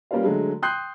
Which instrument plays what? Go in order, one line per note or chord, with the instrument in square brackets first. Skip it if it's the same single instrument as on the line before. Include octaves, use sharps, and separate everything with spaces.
[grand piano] G3 A#3 C#4 F4 B4 F5
D3 F#3 G#3 A3
G5 C6 D#6 F#6 G6 C7